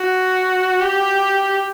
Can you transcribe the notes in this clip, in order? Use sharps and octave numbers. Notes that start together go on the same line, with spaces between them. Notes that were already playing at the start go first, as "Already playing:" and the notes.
Already playing: F#4
G4